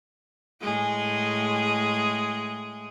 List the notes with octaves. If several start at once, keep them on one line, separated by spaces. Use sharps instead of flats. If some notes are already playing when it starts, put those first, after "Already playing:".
A2 G#3 G#4